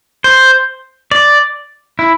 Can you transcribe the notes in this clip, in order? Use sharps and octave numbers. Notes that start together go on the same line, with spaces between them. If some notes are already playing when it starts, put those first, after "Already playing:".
C5
D5
E4